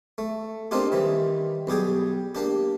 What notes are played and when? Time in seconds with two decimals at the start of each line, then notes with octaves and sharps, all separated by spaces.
0.18 A3
0.71 A#3 C4 D4 D#4 F4 G4
0.92 D#3 E3 G3
1.67 B1 G3 G4 G#4 G5
2.35 A#3 D4 G4